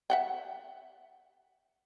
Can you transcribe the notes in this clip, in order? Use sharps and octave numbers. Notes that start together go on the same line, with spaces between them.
E5 F#5 G5